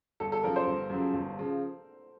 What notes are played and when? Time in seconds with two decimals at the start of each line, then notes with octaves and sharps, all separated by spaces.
0.20 G1 A4
0.32 A4
0.44 F#2 C#3 F3 A#4
0.56 C5
0.67 G1
0.90 F#2 C#3 F3
1.13 G1
1.39 C#3 F3